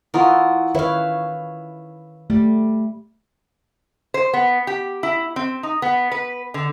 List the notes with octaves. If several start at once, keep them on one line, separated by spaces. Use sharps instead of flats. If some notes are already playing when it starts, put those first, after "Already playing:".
E3 F4 F#4 A#4 D#5
D#3 E4 B4 C#5 F5
G3 A3
C5
B3
G4
E4
C4
D#4
B3
B4
D3